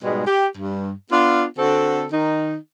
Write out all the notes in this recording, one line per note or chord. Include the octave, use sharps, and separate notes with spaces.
G#2 B2 G3 G#3
G4
G2
B3 D4 F4
D3 C4 F#4 A4
D#3 D#4